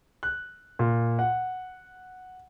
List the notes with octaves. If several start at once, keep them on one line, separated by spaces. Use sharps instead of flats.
F#6
A#2
F#5